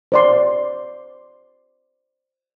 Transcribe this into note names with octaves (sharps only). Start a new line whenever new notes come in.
C5 D5 C6